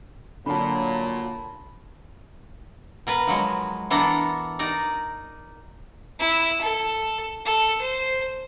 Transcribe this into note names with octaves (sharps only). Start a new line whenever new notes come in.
A#2 D3 F#3 A5 B5
B2 A#4 B4
F3 F#3 G#3
E3 B3 D4 A4 A#4 A#5
D#4 A#4 D5
E4
A4
A4
C5